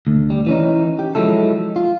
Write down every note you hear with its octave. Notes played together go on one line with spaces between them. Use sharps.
D2
G3
E3 C#4 D#4
G4
F3 F#3 G#3 E4 A4
F4